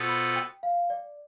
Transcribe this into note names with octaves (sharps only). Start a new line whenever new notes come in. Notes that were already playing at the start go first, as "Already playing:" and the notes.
Already playing: B2 B3 F4 A4 C5
B5
G5
F5
D5